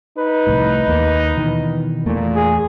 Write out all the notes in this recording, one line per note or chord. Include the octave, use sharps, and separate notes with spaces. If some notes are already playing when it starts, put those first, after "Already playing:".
D#4 B4
C2 F2 A2
D#2 A#3
B2 D#3 E3
E2 A#2 A3 A#3
G#4